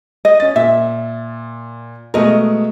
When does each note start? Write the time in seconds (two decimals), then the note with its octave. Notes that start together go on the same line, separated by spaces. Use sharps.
0.25 D#5
0.40 C#4 A6
0.56 A#2 E5
2.14 B2 G#3 A3 A#4 D#5